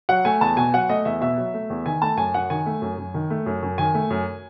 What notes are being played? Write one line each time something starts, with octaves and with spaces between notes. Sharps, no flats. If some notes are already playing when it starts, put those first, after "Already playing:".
F#3 F#5
A3 G#5
E2 A5
B2 G#5
F#3 F#5
A3 D#5
E2 E5
B2 E5
F#3
A3
E2
D#3 G#5
A3 A5
F#2 G#5
F#2 F#5
D#3 G#5
A3
F#2
F#2
D#3
A3
F#2
F#2
D#3 G#5
A3
F#2